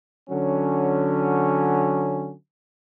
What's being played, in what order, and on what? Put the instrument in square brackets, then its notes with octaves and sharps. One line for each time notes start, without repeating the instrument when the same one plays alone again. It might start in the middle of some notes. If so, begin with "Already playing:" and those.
[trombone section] D3 F#3 C#4